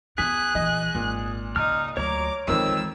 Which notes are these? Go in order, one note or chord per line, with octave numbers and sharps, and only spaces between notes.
B3 F4 G#4 F#6 B6
A#1 E3 D#5
G#1 A#2
C#3 D#4 F6
D2 F#3 C#5 A#5 D6
F2 D#3 E3 G#3 C4 E6